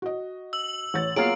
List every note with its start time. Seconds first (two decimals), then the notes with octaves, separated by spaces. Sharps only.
0.02 F#4 D#5
0.53 E6 F#7
0.94 A1 C#5 A6
1.16 F#3 A#3 B3 F4 G#4 C#5 F5 D7